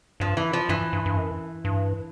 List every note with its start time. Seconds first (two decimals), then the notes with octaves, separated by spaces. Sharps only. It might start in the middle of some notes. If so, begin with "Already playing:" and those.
0.20 G2 F3
0.37 E3
0.53 F3
0.69 G2 E3
0.93 G2
1.06 G2
1.17 F#2
1.65 G2